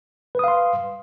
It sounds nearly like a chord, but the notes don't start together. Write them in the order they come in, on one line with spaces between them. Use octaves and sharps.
B4 D#6 F5 C6